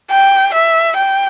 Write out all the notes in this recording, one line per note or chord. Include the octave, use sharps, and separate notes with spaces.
G5
E5
G5